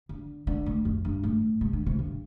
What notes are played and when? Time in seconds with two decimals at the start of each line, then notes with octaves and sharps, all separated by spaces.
0.09 D3
0.47 D3
0.66 A2
0.85 F2
1.05 G2
1.23 A2
1.61 C3
1.73 D3
1.86 C3
1.99 G2